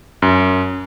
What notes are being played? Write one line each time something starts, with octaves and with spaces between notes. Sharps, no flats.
F#2